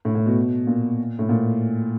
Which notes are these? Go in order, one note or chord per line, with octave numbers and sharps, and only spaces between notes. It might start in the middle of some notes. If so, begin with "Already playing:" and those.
A2
A2
B2
A#2
A2
A#2